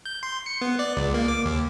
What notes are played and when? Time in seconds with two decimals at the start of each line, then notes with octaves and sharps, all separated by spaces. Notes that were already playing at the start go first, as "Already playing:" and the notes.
0.05 G6
0.23 C6
0.46 C#7
0.61 B3
0.79 D5
0.97 C#2
1.14 A#3
1.28 D6
1.46 D#2